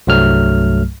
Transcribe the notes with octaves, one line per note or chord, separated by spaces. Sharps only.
C2 G2 F#3 A3 F6